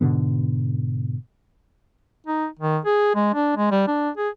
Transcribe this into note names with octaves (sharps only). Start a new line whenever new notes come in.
G#2 B2 D3 B3
D#4
D#3
G#4
G#3
D4
G#3
G3
D4
G#4